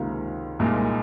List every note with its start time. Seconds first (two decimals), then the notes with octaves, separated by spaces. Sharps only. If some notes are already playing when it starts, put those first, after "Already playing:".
Already playing: C#2 C3 D#3 A#3 F4
0.59 C2 A#2 G#3 D#4 A#4